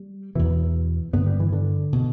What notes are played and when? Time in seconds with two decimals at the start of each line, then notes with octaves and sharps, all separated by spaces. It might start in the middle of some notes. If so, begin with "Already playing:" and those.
Already playing: G3
0.35 E2 B2 E3
1.13 G2 D3 B3
1.26 G3
1.40 E3
1.52 D3
1.93 B2